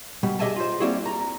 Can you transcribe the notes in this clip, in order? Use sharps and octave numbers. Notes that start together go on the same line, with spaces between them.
B2 G3
G4 G#4 D#5 E5 G#5 A5
F4 C5
G3 A#3 C4 E4 F#4 G#4
A#5